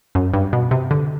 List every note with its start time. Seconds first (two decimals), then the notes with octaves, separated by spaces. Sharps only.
0.15 F#2
0.34 G2
0.53 B2
0.71 C3
0.91 D3